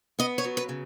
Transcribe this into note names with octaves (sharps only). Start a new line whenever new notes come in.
B3 D#5
C#5
F#3
B4
C#3